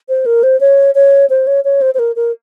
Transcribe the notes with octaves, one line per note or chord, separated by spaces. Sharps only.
C5
A#4
C5
C#5
C#5
C5
C#5
C#5
C5
C5
A#4
A#4